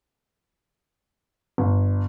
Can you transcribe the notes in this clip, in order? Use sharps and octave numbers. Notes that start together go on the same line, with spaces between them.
G1